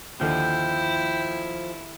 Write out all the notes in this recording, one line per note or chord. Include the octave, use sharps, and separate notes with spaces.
D#2 D3 F3 E4 G5